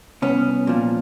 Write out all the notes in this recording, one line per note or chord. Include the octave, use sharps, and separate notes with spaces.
C2 B3 C#4
A#2 F3